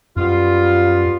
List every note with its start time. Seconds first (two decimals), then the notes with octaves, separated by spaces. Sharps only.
0.16 F#2 G3 B3 F4